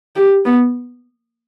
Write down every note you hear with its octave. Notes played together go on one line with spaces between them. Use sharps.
G4
B3